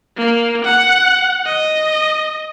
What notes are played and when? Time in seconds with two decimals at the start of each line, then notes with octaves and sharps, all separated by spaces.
0.17 A#3
0.65 F#5
1.46 D#5